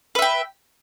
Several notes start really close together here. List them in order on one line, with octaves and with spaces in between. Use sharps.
B4 E5 G5